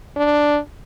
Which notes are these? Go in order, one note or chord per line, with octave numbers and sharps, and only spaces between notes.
D4